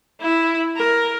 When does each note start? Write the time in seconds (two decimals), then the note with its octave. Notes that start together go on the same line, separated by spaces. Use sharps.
0.21 E4
0.76 A#4